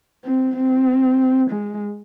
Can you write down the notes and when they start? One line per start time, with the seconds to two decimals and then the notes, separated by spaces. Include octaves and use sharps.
0.25 C4
0.56 C4
1.50 G#3